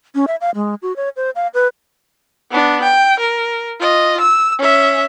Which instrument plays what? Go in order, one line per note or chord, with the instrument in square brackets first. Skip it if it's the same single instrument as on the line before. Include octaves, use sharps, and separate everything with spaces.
[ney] C#4
E5
F5
G#3
F#4
C#5
C5
F5
B4
[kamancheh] B3 D4
G5
A#4
F4 D#5
E6
C#4 E5